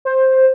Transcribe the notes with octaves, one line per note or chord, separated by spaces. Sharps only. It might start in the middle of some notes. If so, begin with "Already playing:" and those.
C5